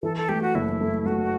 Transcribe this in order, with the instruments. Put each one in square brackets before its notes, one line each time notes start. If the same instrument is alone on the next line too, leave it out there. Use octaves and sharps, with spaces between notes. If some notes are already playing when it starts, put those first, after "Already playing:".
[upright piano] E3 [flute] A4
[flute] A4
[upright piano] A3 [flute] G4
[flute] F#4
[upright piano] F#1 [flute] E4
[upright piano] A3
[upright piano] A3 [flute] F#4